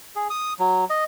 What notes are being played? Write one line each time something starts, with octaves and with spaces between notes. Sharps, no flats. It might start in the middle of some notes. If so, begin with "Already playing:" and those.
G#4
D#6
F#3
D#5